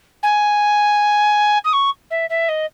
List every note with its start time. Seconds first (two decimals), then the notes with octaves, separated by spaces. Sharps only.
0.23 G#5
1.65 D#6
1.73 C#6
2.11 E5
2.30 E5
2.49 D#5